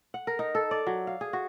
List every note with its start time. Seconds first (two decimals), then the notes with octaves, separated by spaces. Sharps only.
0.14 F#5
0.27 A#4
0.39 D#4
0.55 A4
0.71 D5
0.87 F#3
1.07 F5
1.21 G#4
1.33 F#4